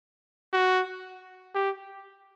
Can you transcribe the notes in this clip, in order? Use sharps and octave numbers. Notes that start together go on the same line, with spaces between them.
F#4
G4